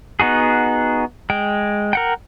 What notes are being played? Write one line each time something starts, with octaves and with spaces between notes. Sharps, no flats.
B3 D#4 F#4 G#4
G#3 G5
A#4 F#5 G5